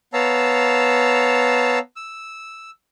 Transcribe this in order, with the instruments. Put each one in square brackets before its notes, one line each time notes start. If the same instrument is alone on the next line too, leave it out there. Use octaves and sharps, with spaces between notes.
[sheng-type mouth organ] B3 C#5 F5 A5 A#5 E6
E6